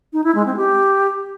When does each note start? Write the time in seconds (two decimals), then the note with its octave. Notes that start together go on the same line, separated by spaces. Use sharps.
0.13 D#4
0.24 E4
0.35 G#3
0.46 C4
0.57 G4